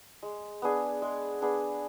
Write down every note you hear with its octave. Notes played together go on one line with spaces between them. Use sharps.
G#3
B3 D4 G#4
G#3
B3 D4 G#4